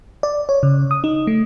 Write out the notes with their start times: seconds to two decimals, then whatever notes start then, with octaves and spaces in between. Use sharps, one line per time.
0.23 D5
0.49 C#5
0.63 C#3
0.91 D#6
1.04 D#4
1.27 A3